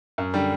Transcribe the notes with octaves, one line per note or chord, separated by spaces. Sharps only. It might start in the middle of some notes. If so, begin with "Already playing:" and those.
F#2
D3 G3